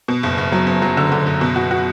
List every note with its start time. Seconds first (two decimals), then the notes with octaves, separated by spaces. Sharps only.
0.08 B2
0.23 F#1
0.38 F#1
0.52 F#3
0.67 F#1
0.82 F#3
0.97 D3
1.12 D3
1.26 F#1
1.41 B2
1.56 F#4
1.71 F#4